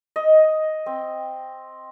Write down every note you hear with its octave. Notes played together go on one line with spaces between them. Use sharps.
D#5
C4